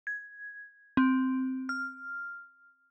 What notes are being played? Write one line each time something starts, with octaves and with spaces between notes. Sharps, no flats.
G#6
C4
F6